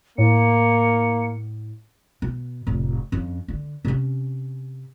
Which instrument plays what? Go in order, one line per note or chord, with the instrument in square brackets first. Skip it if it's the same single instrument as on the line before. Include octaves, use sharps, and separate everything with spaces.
[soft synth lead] A2 [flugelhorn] A#3 [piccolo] C#7
[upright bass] B2
F1 A2
F2 C#4
D3
C3 C#4